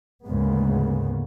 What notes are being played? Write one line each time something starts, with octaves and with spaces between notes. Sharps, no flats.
D2 G#2 C#3 G#3 A#3 B3